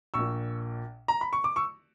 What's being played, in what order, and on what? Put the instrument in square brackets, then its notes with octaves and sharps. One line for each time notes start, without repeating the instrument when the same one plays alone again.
[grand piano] A#1 A#2 C#6 E6
A#5
B5
C#6
D6
C#6 E6